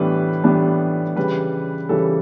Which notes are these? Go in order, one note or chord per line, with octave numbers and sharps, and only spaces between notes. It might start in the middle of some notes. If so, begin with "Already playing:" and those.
Already playing: A2 E3 G3 B3 D4 B4
A2 E3 G3 B3 D4
C#3 E3 G3 B4
C#3 E3 G3 A4